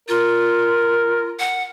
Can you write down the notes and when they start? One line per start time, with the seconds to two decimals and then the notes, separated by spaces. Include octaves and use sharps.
0.09 F4 A#4
1.39 F#5